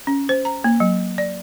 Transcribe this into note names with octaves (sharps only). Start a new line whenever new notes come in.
C#4
C5
A#5
A#3
F#3
D5